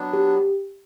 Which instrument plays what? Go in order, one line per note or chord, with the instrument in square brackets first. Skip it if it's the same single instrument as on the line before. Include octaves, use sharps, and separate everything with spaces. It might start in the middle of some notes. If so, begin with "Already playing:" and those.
Already playing: [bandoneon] F#3 B3 D4
[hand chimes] G4